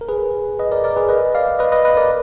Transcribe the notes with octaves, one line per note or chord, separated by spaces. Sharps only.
A#4
G#4 B4
B4 D#5
A#4 D5
A#4 D5
G#4 B4
B4 D#5
D5 F5
B4 D#5
B4 D#5
B4 D#5
A#4 D5